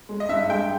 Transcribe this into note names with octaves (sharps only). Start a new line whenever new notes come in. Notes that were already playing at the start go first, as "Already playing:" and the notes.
G#3
D#5
G2 E5
G#3 G5